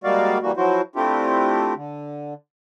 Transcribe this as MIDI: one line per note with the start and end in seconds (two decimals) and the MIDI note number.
0.04 0.38 55
0.04 0.38 56
0.04 0.38 58
0.04 0.38 66
0.04 0.38 74
0.04 0.38 77
0.42 0.52 52
0.42 0.52 55
0.42 0.52 58
0.42 0.52 66
0.57 0.81 53
0.57 0.81 54
0.57 0.81 64
0.57 0.81 66
0.57 0.81 72
0.96 1.74 57
0.96 1.74 60
0.96 1.74 62
0.96 1.74 64
0.96 1.74 65
0.96 1.74 67
1.76 2.34 50